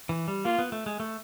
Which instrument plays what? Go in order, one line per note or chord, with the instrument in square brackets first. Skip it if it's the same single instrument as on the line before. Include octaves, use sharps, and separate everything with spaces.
[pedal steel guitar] E3
G3
[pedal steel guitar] A#3 [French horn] F4
[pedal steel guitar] B3
A3
G#3
A3